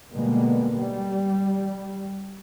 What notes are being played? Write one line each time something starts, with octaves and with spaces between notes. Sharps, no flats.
B2 D3 G3 G#3 A#3 B3
G3